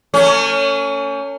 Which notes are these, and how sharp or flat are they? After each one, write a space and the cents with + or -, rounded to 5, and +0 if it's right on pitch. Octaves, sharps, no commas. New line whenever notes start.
A3 +45 C#4 +10 C#5 +10